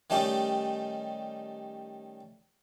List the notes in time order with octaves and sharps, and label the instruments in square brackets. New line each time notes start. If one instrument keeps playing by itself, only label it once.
[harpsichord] D#3 G3 A3 C#4 D#4 G4